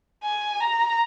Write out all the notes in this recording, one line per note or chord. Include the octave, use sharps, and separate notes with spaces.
G#5
A#5